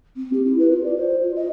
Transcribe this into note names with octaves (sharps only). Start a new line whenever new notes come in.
C4
G4
E4
B4
F4
D5
C5
F4
D#5